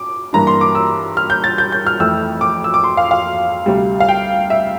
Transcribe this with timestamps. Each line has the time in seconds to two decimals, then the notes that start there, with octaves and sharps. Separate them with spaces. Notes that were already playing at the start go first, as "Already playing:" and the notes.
Already playing: D6
0.33 G2 E3 A#3 D4 A#5
0.47 C6
0.61 D6
0.75 E6
1.17 F6
1.30 G6
1.44 A6
1.58 G6
1.72 G6
1.87 F6
2.00 F2 E3 A3 E6
2.41 D6
2.64 E6
2.74 D6
2.84 C6
2.97 F5
3.11 F5
3.66 D2 C3 G3
4.00 F5
4.09 G5
4.50 E5